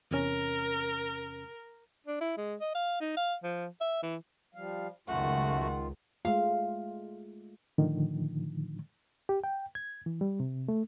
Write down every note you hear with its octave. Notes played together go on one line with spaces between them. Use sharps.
E2 C3 C#4 A#4
D4
E4
G#3
D#5
F5
D#4
F5
F3
E5
E3
F3 G3 F5
C#2 F#2 D#3 A3 F4 F#4 F#5
G#3 A3 F4 F5
A2 D3 D#3 F3
G4
G5
G#6
E3
G3
C3
A3